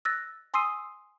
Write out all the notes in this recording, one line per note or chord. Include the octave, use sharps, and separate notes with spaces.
E6 F#6 A6 A#6
G#5 C6 D#6 E6 C7 D#7